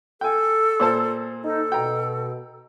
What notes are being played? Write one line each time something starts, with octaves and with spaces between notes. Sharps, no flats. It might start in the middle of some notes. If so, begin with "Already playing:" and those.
A4 G5 G#5
A#2 C5 A5
D#4 A4
B2 G5 A#5